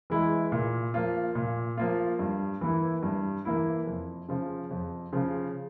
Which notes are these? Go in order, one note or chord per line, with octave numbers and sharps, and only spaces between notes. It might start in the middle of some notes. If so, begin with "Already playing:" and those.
E3 G#3 E4
A#2
F3 A#3 F4
A#2
F3 A#3 F4
G2
E3 A#3 E4
G2
E3 A#3 E4
F2
C#3 F3
F2
C#3 F3